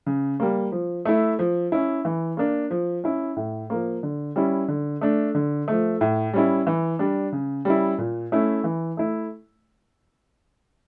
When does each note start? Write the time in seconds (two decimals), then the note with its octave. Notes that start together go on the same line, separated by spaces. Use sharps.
0.06 C#3
0.40 G3 A#3
0.72 F3
1.05 A3 E4
1.39 F3
1.72 C#4 E4
2.05 E3
2.37 A#3 D4
2.71 F3
3.04 C#4 E4
3.36 A2
3.70 F3 A#3
4.03 D3
4.36 G3 C#4 E4
4.68 D3
5.01 A3 D4
5.35 D3
5.68 F3 A3
6.01 A2
6.33 G3 C#4 E4
6.67 E3
6.99 G3 D4
7.32 C#3
7.65 G3 C#4 E4
7.98 A#2
8.32 A3 C#4 E4
8.64 E3
8.97 A3 E4